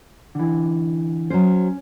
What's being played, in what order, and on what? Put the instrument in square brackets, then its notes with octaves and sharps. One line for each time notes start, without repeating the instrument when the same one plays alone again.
[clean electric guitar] D3 E3
[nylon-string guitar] F#3 C5 [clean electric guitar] C#4